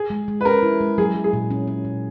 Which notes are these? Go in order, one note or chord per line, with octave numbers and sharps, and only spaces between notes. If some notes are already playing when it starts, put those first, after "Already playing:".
Already playing: G#4
G#3
G#3
B4
C#4 A#4
E4
G#3
F#3 G#4
F#3
G#4
A#2
C#4
C#4
A#2